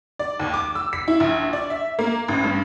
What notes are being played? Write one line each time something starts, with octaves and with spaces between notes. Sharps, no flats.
D5
D#2
D6
E6
B6
E4
A#1
D5
E5
A#3
A1
G2